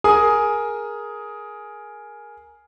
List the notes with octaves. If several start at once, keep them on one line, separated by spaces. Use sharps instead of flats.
G#4 A#4 G#5 D#6